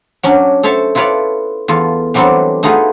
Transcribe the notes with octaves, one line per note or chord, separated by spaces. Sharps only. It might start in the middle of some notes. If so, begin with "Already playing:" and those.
F#3 C#4 D4
A4 C5 C#5 E5 A5
E4 F4 A4 B4 C#5 D5
E2 F4 A4
E3 F#3 G3 C4 D4 A4
A3 D#4 F4 F#4 G#4 B4